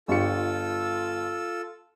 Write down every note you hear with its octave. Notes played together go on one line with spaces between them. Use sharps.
G1 F4 G4 A4 E6 C#7